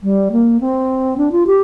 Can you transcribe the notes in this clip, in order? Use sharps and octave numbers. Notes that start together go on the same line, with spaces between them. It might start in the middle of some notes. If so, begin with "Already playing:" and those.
G3
A#3
C4
D4
F4
G4